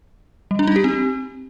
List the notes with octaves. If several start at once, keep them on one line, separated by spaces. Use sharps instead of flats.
G3
D4
D#4
G4
C4